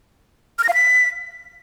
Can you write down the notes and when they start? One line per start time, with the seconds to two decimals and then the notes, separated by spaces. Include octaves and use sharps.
0.58 F6
0.64 A#6
0.69 F5
0.74 B6